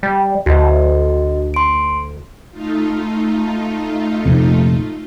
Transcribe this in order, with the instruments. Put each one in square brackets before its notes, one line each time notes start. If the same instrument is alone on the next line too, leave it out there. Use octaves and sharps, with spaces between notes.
[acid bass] G3
[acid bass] D2 [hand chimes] F#4 D#5
[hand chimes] C6 D7
[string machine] A3 D#4 F4
[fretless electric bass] A#1 F2 C3